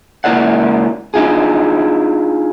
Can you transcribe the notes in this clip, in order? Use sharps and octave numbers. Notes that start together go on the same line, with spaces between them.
C#2 A#3 E4 A#4 D5 F#5
D4 D#4 F4 G#4